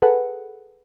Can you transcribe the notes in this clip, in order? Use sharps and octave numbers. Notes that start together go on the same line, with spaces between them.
G#4 A4 B4 F#5